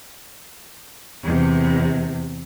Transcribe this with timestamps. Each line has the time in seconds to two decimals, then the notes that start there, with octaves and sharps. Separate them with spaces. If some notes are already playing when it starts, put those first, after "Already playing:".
1.23 E2 C3